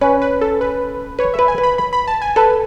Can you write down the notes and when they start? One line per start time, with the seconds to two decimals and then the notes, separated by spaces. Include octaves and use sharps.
0.01 C#4 B4
0.22 B4
0.41 A4
0.61 B4
1.19 B4 C#5
1.34 E5
1.39 B4
1.48 G#5
1.58 B4
1.63 B5
1.78 B5
1.93 B5
2.08 A5
2.22 G#5
2.36 A4 B4